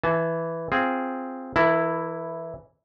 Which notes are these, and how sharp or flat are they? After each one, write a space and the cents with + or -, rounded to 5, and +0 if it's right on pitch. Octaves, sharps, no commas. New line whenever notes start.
E3 +0 A5 -30
C4 +0 F4 +0 G#4 +0
E3 +0 E4 +0 A#4 -40